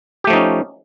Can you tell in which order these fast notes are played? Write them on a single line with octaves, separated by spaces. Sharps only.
G4 A3 F3 D#4 C#4